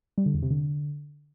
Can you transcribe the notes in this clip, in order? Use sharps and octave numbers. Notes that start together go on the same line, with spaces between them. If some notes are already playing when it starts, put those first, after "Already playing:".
G3
D3
E2
C3
D3